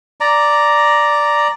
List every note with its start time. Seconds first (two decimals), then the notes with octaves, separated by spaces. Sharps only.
0.20 D5 A#5